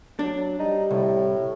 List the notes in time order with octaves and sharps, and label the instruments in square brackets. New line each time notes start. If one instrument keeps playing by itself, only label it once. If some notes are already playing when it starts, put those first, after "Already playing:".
[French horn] F#3 [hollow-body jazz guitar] D4
[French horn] G3 [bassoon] D#4
[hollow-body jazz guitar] C2 [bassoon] A2